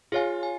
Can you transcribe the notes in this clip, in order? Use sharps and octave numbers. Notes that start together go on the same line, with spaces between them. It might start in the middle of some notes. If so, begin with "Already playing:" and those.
F4 G#4 C#5 F5 G#5
G#5